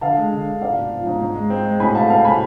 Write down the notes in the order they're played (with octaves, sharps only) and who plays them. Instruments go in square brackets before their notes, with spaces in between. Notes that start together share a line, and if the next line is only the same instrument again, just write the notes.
[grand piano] D3 [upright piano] F5 A5
[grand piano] G#3
D3
D4
[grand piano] G#2 [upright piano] D5 F5
[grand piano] B3
F3
G#2
G#2
G#3
C4
G#3
[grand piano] A2 [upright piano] G#5 B5
[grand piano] A3 [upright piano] F5 A5
[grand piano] C4 [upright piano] F5 A5
[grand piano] A2 [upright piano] G#5 B5